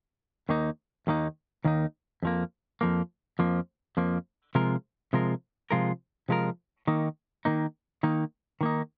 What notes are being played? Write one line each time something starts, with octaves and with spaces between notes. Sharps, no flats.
D#2 D#3 A#3 D#4
D#2 D#3 A#3 D#4
D#2 D#3 A#3 D#4
F2 F3 A#3
F2 F3 A#3
F2 F3 A#3
F2 F3 A#3
C3 F3 G#3 F4 A#4
C3 F3 G#3 F4 A#4
C3 F3 G#3 F4 A#4
C3 F3 G#3 F4 A#4
D#3 A#3 D#4
D#3 A#3 D#4
D#3 A#3 D#4
D#3 A#3 D#4